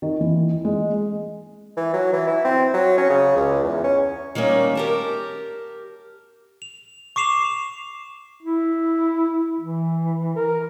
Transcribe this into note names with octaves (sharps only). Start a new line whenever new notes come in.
D#3
E3
G#3
E3
F#3
E3
E4
C4
F#3
C#4
C#3
C#2
E2
C#4
D#3 G3 A#3 C#4
G4 A#4 A5
F7
C#6 D6 C7 E7 F7
E4
E3
A#4